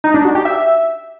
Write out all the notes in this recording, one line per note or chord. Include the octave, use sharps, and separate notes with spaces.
D#4
D4
F#4
G4
E5